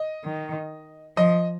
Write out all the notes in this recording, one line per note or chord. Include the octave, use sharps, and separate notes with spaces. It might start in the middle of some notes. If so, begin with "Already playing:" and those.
Already playing: D#5
D#3
F3 D#5